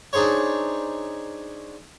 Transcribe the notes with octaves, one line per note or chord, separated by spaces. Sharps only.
D4 D#4 G#4 C5 C#5